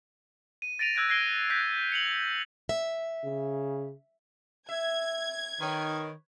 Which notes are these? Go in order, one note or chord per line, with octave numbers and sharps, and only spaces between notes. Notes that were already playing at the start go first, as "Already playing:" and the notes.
D#7
A6 A#6 D7 D#7 F7
E6 F#6 G#6 A#6 D7
F#6 G#6 A#6 C7 D7 G7
F#6 G6 A#6 B6 D7
C#7 F7 F#7
E5
C#3
E5 G#6
D#3 B4 C#5